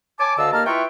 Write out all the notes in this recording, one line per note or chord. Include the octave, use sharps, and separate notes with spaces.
C#5 G#5 A5 D6
D2 D3 D#5 F5 A5 E6
D#2 A#3 D#5 A5 A#5 F6
E4 F4 B4 E5 G5 C#6